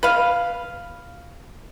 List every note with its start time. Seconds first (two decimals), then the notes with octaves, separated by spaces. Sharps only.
0.03 B4 F5